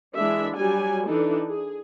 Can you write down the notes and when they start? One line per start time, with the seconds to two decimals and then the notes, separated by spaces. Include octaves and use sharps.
0.15 E3 G#3 D4 E5
0.55 F#3 G3 G#5
1.07 E3 D4 D#4 A4
1.49 G#4